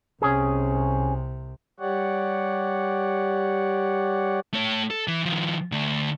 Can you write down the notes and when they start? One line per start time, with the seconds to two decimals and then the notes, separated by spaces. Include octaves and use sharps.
0.22 C2 C3 C#4 G#4
1.80 G3 G4 C#5 D5 F#5
4.53 A3 C#5
4.91 A4
5.08 E3
5.25 D#3 F3
5.72 D3 A3